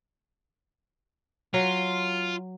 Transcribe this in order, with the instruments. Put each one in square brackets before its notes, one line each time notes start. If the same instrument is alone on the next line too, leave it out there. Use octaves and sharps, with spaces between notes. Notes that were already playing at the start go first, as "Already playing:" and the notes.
[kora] F#3 [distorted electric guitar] F4